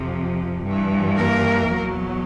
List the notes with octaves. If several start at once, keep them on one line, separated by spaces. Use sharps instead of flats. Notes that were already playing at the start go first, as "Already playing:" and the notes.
Already playing: F2 C3 F3
G2 E3
A#3 A#4
E2 B2 F#3